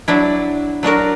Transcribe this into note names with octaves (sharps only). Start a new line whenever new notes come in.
F#3 D4 E4
F#3 D4 F#4 A#4